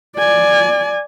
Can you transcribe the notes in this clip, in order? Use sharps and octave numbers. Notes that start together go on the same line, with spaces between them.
D5 G#5